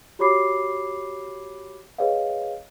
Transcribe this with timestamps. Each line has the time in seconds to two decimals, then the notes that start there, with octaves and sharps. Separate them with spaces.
0.19 F#4 G4 C#5 B5 D6 C7
1.98 G#4 B4 C#5 D#5 F5